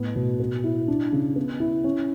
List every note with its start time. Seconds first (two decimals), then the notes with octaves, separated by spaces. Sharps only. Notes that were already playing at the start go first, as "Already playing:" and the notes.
Already playing: A2 B3
0.15 B2
0.40 B3
0.64 E4
0.88 D4
1.12 C#3
1.36 B3
1.60 E4
1.84 C#4